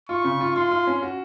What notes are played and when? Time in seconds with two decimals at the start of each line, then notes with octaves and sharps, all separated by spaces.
0.09 F4 C#6
0.24 C#3
0.40 F4
0.56 F4 C6
0.71 F4
0.87 C#4
1.03 F#4